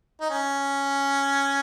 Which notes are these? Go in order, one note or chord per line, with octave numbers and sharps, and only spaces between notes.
D#4
C#4